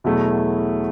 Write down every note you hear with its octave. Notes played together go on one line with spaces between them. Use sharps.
E2 B2 F#3 A3 E4